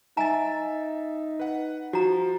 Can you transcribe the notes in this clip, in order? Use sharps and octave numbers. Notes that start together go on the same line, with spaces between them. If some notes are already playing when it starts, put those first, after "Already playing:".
D#4 E5 G#5 A#5 A6
B4 F#5
F3 F#4 A#5